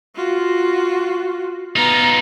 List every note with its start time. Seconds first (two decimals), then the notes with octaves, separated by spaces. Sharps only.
0.15 F4 F#4
1.76 B3 D#4 F4 A#5